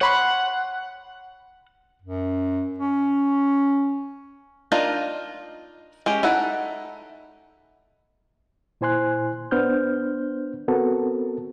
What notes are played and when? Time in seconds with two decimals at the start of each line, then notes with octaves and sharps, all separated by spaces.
0.01 C#5 F#5 B5 C6
2.02 F#2
2.79 C#4
4.72 D4 D#4 F4 A#4 D#5
6.06 G#3 C#4 G4
6.23 D#4 E4 A4 F#5
8.81 A#2 E4 C5 G#5 C6 F#6
9.51 B3 D4 C5 F6 G6
10.68 B3 C4 F#4 A4 A#4